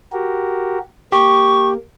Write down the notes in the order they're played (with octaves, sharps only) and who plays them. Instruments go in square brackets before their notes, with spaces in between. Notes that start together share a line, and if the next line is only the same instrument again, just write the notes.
[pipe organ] F#4 G4 A#4
[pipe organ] A#3 [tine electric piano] G4 [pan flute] C#6